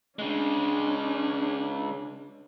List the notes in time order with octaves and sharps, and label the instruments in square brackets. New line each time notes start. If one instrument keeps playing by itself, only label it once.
[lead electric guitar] C#3 G#3 [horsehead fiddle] C#4 D4